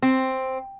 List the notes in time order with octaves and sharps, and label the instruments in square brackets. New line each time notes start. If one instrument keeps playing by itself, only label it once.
[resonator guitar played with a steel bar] C4